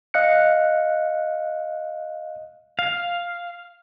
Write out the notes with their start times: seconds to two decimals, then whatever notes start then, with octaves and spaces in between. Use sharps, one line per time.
0.14 D#5 F5 F#6 C#7
2.79 F5